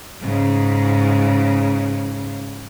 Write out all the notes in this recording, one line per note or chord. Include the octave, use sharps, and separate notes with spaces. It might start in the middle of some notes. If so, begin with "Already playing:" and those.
G#2 C#3